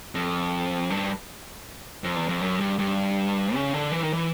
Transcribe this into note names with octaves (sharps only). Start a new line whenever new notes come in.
F2
G2
F2
E2
F2
F#2
G2
G2
C#3
D3
E3
D#3
E3